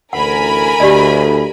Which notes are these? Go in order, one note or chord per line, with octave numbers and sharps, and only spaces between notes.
A1 D2 A#4 F#5 G#5 B5
D2 G4 D5 D#5